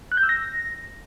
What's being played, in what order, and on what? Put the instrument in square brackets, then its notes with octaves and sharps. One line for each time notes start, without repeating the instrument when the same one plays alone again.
[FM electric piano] F#6
G6
E6
A#6